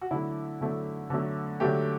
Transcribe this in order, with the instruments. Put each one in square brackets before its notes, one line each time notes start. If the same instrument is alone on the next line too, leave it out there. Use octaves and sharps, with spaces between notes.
[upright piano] F#4
D3 F#3 A3 E4
D3 F#3 A3
D3 F#3 A3
D3 F#3 A3 G4